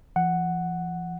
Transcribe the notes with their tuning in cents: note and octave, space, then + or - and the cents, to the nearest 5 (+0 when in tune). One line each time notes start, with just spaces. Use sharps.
F3 -40 F#5 +0